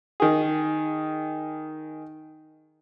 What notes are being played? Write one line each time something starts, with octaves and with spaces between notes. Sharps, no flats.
D#3 G#4